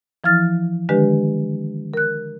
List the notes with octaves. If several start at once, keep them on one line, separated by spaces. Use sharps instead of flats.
E3 F3 E4 F6 A6
D3 D#3 G#3 D4 G4 B4
A#4 F#6